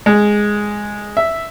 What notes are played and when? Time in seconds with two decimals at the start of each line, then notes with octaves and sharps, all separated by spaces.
0.06 G#3
1.17 E5